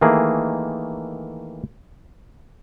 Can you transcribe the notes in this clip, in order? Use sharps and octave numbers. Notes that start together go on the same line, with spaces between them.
D#3 E3 A3 A#3 G#4